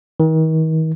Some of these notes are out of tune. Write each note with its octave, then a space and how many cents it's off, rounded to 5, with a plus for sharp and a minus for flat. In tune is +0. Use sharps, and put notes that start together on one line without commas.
D#3 +40